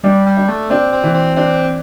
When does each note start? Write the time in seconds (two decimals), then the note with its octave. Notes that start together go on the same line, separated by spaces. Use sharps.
0.03 G3 D4
0.26 G3
0.37 D4
0.48 A3
0.70 C4 D4
0.93 C4
1.03 E3
1.14 C4
1.36 C4 D4